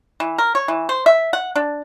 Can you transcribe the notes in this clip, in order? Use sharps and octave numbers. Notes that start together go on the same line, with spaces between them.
E3
A#4
C#5
E3
C5
E5
F#5
D4